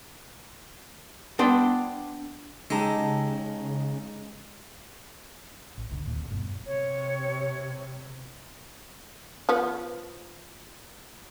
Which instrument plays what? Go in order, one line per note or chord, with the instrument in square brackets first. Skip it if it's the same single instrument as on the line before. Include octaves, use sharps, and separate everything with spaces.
[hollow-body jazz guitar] B3 D4 G5 C6
[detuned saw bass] C#3 [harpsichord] G#3 [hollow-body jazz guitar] D#4 G4 [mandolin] A5 A#5 E6
[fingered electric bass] A1
F1 C2 D3
D1 D#2 A#2
F#1 G2 B2
[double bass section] C3 [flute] C#5
[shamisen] F3 B3